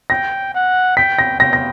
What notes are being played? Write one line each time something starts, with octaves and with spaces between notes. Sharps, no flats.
G5 A#6
F#5
G5 B6
A#6
G5 A#6
A#6